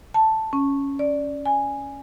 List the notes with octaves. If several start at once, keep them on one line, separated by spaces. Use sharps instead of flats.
A5
C#4
D5
G#5